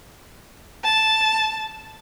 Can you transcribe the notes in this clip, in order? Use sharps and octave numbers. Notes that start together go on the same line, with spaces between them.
A5